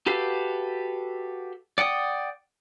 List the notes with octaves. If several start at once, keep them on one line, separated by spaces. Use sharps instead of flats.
F#4 G4 A4 B4 F5
D5 F#5 G5 D#6